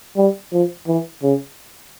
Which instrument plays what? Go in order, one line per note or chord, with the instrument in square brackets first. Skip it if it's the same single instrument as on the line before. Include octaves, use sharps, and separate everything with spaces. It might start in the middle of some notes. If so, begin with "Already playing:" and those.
[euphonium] G3
F3
E3
C#3